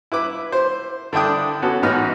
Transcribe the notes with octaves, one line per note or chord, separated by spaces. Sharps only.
E4 B4 D6
C5
D3 D4 E4 G5 D#6
B3 C#4 F#4 A4
A1 G#2 B3 D#4 F#4 F6